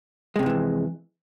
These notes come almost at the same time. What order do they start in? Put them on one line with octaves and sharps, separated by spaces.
G#3 C3 G#2 E3 F2